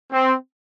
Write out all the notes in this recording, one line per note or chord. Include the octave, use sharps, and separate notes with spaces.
C4